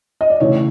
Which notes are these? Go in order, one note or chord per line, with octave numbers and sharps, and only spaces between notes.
D#5
D5
C#3 E3 A3 C#5